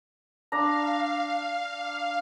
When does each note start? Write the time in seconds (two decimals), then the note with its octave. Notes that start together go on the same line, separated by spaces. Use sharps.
0.52 D4 F5 A#5